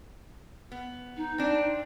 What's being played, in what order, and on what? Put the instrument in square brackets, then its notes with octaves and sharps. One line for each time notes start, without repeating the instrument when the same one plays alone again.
[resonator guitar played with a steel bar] B3
[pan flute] D#4
[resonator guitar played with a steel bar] C4 D4